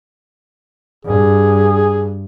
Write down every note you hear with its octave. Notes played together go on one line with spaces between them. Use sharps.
G2 G#4